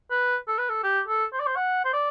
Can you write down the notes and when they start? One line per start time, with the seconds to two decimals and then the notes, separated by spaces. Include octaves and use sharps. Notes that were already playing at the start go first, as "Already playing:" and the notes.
0.11 B4
0.48 A4
0.58 B4
0.69 A4
0.83 G4
1.08 A4
1.33 C5
1.40 D5
1.47 C5
1.56 F#5
1.85 C5
1.93 D5